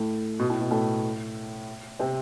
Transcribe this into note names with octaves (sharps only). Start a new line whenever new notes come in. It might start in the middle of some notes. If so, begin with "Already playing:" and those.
Already playing: A2 A3
B2
A2
B2
A2 A3
C3 C4